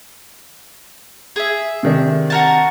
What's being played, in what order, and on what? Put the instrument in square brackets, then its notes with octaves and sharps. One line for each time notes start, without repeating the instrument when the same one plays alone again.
[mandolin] G#4 E5
[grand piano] C3 D#3 D4
[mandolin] F#4 A#4 A5